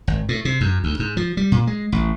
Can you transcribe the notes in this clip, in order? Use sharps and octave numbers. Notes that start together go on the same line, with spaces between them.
G#1
A2
C3
F#2
D2
G#2
F3
G3
A#2
G#3
A1